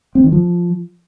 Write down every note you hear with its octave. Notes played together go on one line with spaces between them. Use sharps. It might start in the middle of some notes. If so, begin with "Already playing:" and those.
C4
D#3
F3